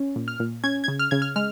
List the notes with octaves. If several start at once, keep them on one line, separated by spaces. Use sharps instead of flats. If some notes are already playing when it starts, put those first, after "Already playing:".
Already playing: C#4
A#2
F6
A#2
C#4 G#6
G#6
C#3
F6
C#3 G#6
F6
G#3 F6